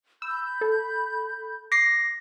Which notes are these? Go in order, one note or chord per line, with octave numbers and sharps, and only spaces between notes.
B5 E6 G6
A4
D6 A#6 C7